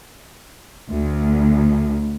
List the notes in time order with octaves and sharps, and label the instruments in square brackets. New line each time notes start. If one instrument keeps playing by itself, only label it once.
[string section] D2